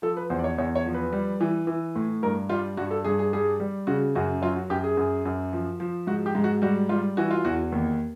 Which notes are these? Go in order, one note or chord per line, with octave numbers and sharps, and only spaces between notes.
F3 A4
B4
E2 C5
D5
C#5
E2 C#5
C#5
F3
B4
G3
E3
E3
A2
G2 A#4
G3 F4
G2 F#4
A4
G2 G#4
G#4
G3 G#4
G3
C#3 F#4
F#2 F#4
F#3 F4
F#4
F#2 G4
G#4
F#2
F#2
F3
F3
G#2 F#4
G4
G#2
F#4
G3 F#4
G3 F4
E3 F#4
F4
E2 F#4
D#2